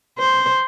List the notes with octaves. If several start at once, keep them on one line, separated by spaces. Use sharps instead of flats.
C5